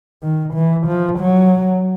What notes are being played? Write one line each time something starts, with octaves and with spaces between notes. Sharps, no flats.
D#3
E3
F3
F#3